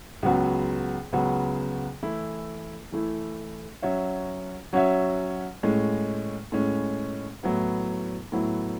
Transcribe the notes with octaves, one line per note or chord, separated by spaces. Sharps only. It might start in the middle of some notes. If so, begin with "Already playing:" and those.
C#2 C#3 F#3 B3 F#4
C#2 C#3 F#3 B3 F#4
E3 A3 E4
E3 A3 E4
F#3 C#4 F#4 C#5 E5
F#3 C#4 F#4 C#5 E5
A2 G#3 C#4
A2 G#3 C#4
A2 F#3 B3 E4
A2 F#3 B3 E4